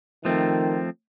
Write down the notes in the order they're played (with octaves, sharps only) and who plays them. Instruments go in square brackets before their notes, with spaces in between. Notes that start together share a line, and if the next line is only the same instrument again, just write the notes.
[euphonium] D#3 [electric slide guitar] F3 A3 C4